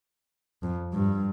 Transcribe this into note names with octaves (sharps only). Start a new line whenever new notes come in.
F2
G2